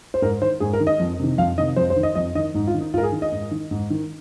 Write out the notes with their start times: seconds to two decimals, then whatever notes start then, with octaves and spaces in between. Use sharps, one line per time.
0.14 C5
0.22 G#2 A#4
0.42 D#3 C5
0.60 G#2 G#4
0.73 A#4
0.80 D#3
0.87 D#5
0.99 F2
1.19 C3 D#3
1.38 F2 F5
1.58 C3 D#3 D#5
1.76 F2 C5
1.90 C5
1.96 D#3
2.03 D#5
2.15 F2 D#5
2.35 D#3 D#5
2.55 G#2 D#4
2.67 F4
2.74 D#3
2.81 D#4
2.93 G#2 F4
2.98 A#4
3.03 G#4
3.12 D#3
3.22 D#5
3.32 G#2
3.51 D#3
3.71 G#2
3.90 D#3